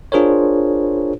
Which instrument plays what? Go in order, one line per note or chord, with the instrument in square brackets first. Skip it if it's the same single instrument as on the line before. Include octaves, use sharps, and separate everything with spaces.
[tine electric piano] D4 F4 G#4 A#4 C5 C#5